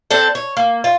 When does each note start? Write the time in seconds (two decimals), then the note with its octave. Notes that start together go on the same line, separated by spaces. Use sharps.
0.10 C4 D4 A4
0.35 C#5
0.57 A#3
0.84 F4